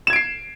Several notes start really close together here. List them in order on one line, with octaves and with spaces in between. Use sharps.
E7 G#6 D7 C7